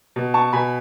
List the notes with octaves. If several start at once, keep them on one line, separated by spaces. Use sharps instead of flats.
B2
A5 C#6
B2 G#5 B5